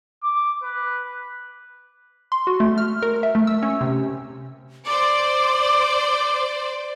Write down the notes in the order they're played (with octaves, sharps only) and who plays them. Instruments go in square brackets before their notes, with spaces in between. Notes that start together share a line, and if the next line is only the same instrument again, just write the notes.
[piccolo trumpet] D6
B4
[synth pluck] C6
F#4
A3
F6
A#4
E5
A3
E6
C#4
C3
[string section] C5 D5 [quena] D6